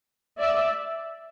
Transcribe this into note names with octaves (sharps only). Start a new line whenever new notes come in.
D5 E5